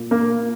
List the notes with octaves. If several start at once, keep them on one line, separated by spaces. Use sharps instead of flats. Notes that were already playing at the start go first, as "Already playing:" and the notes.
Already playing: A#2
A#3